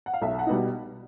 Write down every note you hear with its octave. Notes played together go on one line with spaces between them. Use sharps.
F#5
F5
B1 E5
F#5
B2 G3 B3 D#4